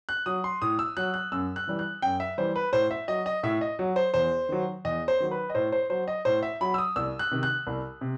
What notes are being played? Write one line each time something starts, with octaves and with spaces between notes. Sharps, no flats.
F#6
F#3 D#6
C6
A2 D#6
E6
F#3 F#6
F#6
F#2 E6
F#6
E3 G3
F#6
F#2 G5
E5
E3 G3 C5
B4
A2 C5
E5
F#3 D#5
D#5
A2 E5
D#5
F#3
C5
E2 C5
D#3 F#3
E2 D#5
C5
D#3 F#3
B4
D#5
A2 C5
C5
F#3 C5
D#5
A2 C5
E5
F#3 B5
E6
D#6
C2 E6
F#6
C3 D#3
F#6
C2
C3